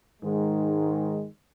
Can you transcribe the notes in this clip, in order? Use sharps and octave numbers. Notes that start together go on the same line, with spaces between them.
G#2 D#3 G#3